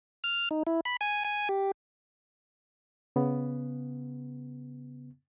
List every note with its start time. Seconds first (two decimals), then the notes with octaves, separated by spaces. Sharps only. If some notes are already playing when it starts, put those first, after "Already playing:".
0.24 F6
0.51 D#4
0.67 E4
0.85 B5
1.01 G#5
1.24 G#5
1.49 G4
3.16 C#3 B3